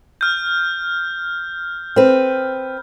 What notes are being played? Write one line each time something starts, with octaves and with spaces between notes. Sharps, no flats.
F6 G6
C4 B4